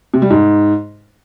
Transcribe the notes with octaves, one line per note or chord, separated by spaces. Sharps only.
C3
G3
G#2